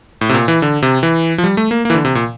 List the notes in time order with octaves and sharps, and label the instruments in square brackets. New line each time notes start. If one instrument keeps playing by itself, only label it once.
[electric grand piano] A2
C3
A#2
E3
D3
C3
E3
F3
G3
A3
A#3
A#3
E3
D3
C3
A#2